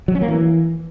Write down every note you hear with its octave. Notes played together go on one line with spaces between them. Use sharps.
F#3
C#4
A#3
E3